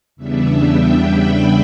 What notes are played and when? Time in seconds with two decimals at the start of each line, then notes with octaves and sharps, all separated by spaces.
0.16 E2 C#3 G3 B3 D4 E5
0.61 G5
1.06 B5